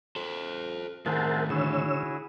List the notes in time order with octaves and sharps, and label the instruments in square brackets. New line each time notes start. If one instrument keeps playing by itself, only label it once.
[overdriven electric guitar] A4 C5
[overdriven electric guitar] A2 D#3 [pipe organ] G#4 C5 E5 [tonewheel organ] A#4 F#5 A5
[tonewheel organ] D3 C#5 E6 [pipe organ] E4 F#4 G#4